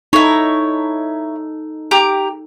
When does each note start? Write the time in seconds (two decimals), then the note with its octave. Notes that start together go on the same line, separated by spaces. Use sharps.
0.13 D#4 E4 A4 C#5
1.91 G4 A#5 D6